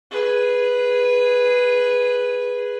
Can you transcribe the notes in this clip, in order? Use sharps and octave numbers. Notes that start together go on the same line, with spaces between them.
G#4 B4